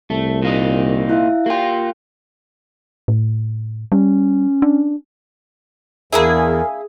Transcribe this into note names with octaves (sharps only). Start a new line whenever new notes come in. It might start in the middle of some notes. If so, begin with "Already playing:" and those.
C2 A3
A#2 A#3 D#4
E4 E5 F5
A#3 F4 G4 G5
A2
G3 C#4
D4
E2 A#3 D4 E4 G#4 A#4